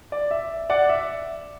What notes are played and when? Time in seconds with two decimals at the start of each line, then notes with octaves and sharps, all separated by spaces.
0.12 D5
0.31 E5
0.70 D5 F#5
0.89 E5